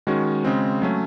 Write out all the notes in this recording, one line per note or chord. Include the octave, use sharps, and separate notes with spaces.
D#3 G#3 C#4 F#4
C#3 G#3 C4
F#3 A3 C#4